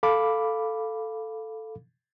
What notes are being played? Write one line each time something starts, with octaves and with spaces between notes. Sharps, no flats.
A4 F5 B5 D6